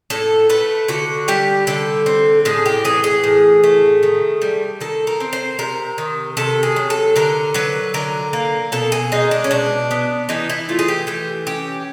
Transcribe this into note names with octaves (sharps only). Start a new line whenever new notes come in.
A2 A4
A3 B4
D3 F#4
G3 G4
D3 A4
C4
A2 G#4
G4
E3 G#4
G#4
A2
A3
D#3
G3
D#3 A4
A#4
C4
C5
C3 A#4
D#3
C3 A4
G#4
F#3
A4
D3 A#4
F#3 B4
D3 A#4
A#3
B2 A4
G#4
G#3 D#4
D4
C#4
B2 D4
B3
E3 D#4
E4
A3 F4
G#4
G4
E3 G4
C#4 G4